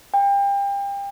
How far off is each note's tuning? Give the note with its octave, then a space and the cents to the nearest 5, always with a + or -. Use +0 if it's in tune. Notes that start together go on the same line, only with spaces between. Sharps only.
G5 +30